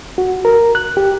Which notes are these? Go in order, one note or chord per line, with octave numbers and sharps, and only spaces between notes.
F#4
A#4
F#6
G4